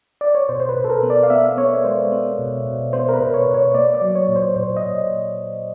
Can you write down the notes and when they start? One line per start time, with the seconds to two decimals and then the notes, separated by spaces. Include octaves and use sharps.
0.21 D5
0.35 C#5
0.49 B2 C5
0.60 C5
0.69 B4
0.76 B2
0.84 A4
0.90 A#4
1.03 B3
1.10 D5
1.23 F5
1.30 B3 E5
1.57 B3 C#5
1.84 G#3 C5
2.12 B3
2.39 B2
2.66 B2
2.93 B3 C5
3.09 A#4
3.14 B4
3.20 B2
3.34 C#5
3.47 B2
3.54 C#5
3.74 A#3 D5
3.95 D5
4.01 F#3
4.15 C#5
4.29 A#2
4.36 C5
4.56 A#2 C5
4.77 D#5
4.83 A#2